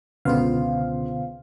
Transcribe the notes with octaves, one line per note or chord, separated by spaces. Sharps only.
C#2 B2 D3 B3 F4 C5 F5